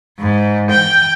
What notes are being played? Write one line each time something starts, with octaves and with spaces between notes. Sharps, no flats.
G#2
G5